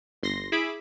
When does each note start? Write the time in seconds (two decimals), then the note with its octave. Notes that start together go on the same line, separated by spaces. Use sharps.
0.23 G1 C6 A#6
0.52 E4 G#4 E5 B5 D6